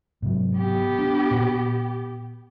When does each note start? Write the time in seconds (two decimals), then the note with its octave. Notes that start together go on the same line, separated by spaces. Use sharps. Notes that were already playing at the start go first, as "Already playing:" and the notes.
0.22 G#2 C3 F#3
0.56 B3 G4
0.99 D4
1.31 A#2